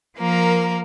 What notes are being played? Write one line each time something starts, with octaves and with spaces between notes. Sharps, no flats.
F3 A#3 A#4